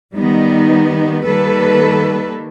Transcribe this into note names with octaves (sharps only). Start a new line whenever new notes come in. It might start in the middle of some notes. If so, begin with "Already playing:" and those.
D#3 G3 B3 D#4
D#3 G3 A#3 A4 B4